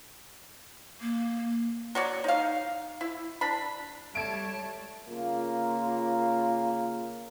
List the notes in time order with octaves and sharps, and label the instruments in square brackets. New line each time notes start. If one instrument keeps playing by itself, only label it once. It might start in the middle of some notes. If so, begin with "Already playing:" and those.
[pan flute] A#3
[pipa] F#3 C#5 D5
D#4 F5
E4
D4 B5
[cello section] G3 [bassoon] A3 [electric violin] C#5 A5 [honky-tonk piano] G#6 D7
[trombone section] C#3 A#3 F4